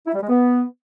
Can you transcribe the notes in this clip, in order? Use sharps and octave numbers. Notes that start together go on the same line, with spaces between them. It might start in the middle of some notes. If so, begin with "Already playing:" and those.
E4
G3
G#3
B3